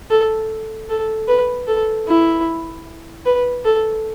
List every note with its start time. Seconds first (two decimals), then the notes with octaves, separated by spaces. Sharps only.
0.10 A4
0.89 A4
1.28 B4
1.67 A4
2.07 E4
3.25 B4
3.65 A4